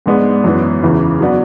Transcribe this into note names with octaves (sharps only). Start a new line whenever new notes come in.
G#2 G#3 B3 D4
F#2 E3 B3
E2 C#3 E3
F#3 B3 D4 F#4